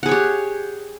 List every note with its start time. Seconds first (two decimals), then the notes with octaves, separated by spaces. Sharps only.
0.03 F#5
0.06 G#4
0.09 C#5
0.11 G4